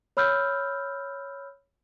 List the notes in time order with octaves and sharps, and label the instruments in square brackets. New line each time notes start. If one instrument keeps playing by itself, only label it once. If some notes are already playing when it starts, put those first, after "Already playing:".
[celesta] C#5 B5 E6 F6 G6